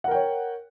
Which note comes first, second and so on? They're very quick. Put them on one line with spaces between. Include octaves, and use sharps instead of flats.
F#5 A#4 G5 C#5